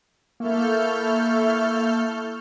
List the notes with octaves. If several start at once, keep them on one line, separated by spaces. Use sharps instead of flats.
A#3 E4 A4 C#6 F6 G6